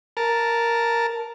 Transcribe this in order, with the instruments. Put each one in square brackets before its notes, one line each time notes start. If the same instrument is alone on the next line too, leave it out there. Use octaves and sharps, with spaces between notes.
[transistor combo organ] A#4 A5